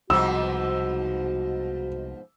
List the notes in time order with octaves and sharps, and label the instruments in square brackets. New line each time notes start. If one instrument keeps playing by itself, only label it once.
[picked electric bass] C2 [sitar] G#2 B2 F3 [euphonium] F#4 [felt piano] E6